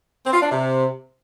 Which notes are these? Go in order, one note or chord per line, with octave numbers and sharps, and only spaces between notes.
C4
F4
D4
C3